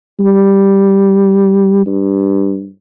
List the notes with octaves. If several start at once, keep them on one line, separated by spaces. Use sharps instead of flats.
G3
G2